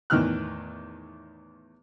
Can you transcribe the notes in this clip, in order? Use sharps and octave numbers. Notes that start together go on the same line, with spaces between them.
E2 A2 D#3 E3 F6 F#6